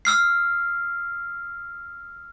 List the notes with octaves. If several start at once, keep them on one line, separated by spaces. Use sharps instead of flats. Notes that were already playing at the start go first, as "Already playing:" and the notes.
E6 F6 C7